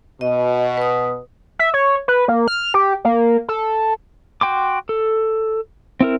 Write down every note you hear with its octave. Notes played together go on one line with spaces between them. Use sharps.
B2 D#5
B4 D#6
E5
C#5
B4
A#3
F6
G4
A#3
A4
F#4 G5 C6 D6
A4
C4 E4 A#4